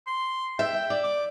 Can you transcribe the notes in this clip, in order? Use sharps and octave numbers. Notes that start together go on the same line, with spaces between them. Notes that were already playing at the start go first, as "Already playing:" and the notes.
C6
E5 G5
D5
D6